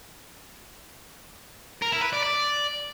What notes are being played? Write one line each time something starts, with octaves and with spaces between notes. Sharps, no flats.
A#4
E4
B4
D5
D5